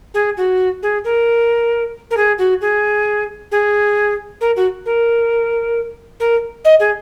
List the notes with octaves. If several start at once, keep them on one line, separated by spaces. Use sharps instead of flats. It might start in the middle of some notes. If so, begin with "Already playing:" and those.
G#4
F#4
G#4
A#4
A#4
G#4
F#4
G#4
G#4
A#4
F#4
A#4
A#4
D#5
G#4